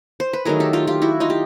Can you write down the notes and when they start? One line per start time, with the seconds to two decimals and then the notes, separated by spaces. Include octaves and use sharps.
0.20 C5
0.33 B4
0.45 D#3 F#3 A3 G#4 A#4
0.60 G4 A4
0.73 F4 G4
0.87 F4 G4
1.02 E4 F#4
1.20 D#4 F4
1.30 G4